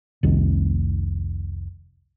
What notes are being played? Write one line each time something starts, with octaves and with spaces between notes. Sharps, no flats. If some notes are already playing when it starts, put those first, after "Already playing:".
F1 C2 D#3